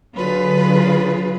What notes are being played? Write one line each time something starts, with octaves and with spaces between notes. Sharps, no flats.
D3 F#3 F4 G#4 B4